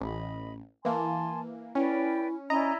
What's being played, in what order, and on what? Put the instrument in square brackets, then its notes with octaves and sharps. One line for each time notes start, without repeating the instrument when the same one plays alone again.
[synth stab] A1 [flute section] D#5 B5
[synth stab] E3 A#3 [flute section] G#5 A5 C6
[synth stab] C#4 [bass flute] E4 [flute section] B4 D5 G5
[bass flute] C#4 [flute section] E4 D5 B5 [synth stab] D#5 A#5